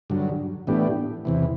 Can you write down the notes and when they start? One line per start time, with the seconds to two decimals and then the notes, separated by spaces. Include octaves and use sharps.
0.10 G2 D3 F#3
0.67 A2 E3 B3 D4 G4
1.25 E2 C3 E3